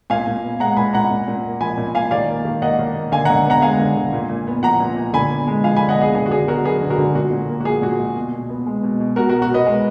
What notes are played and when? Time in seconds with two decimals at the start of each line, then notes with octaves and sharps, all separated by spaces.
0.10 A#2 F5 G#5
0.27 A#2
0.43 B3
0.60 G#3 F#5 A#5
0.77 A#2 G#5 B5
0.93 A#2 F#5 A#5
1.11 A#2
1.28 A#2
1.45 A#3
1.61 F3 G#5 B5
1.77 A#2
1.95 A#2 F5 G#5
2.11 D#3 D5 F5
2.28 A#3
2.45 D#3
2.62 A#3 D#5 F#5
2.79 D#3
2.95 A#3
3.12 D3 F5 G#5
3.25 D3 F#5 A#5
3.46 B3 F#5 A#5
3.62 G#3 F5 G#5
3.79 D3
3.97 D3
4.13 A#2
4.29 A#2
4.47 B3
4.63 F3 F#5 A#5
4.80 A#2
4.96 A#2
5.13 D3 G#5 B5
5.30 B3
5.47 G#3
5.64 F3 F5 G#5
5.76 D3 G#5 B5
5.89 D#5 F#5
5.97 B3 G#4
6.15 D3 G#4
6.26 F#4
6.31 D3 G#4
6.48 B3 F#4 A#4
6.65 F#3 G#4 B4
6.81 D3
6.90 F#4 A#4
6.98 D3
7.15 A#2 F#4
7.32 A#2
7.49 A#3
7.60 F#4
7.65 F3 G#4
7.82 A#2 F#4
7.99 A#2
8.16 B2
8.33 B2
8.50 B3
8.66 G#3
8.84 B2
9.00 B2
9.16 B2 F#4 A#4
9.29 F#4 A#4
9.33 B2
9.42 F#4
9.51 B3 B4 D#5
9.66 G#3